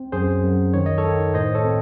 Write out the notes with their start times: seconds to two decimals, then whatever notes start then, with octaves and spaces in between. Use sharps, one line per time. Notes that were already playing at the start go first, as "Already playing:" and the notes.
Already playing: C4
0.12 F#2 G#4 C5
0.43 F#2
0.74 D#3 C#5
0.86 D#5
0.98 A4 C#5
1.05 D#3
1.34 A2 C5 D#5
1.55 A4 C#5
1.65 C4